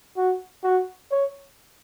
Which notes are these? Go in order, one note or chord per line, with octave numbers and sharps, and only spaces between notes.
F#4
F#4
C#5